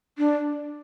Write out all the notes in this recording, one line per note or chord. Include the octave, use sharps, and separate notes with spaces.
D4